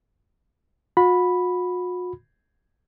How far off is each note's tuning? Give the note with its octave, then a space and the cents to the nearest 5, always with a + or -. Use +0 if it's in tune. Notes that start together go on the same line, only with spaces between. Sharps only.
F#4 -45 B5 +0